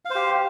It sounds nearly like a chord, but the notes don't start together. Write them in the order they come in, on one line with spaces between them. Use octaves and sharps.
F5 C5 G4